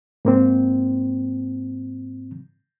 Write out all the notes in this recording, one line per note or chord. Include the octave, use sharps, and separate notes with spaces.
G#2 A#3 C4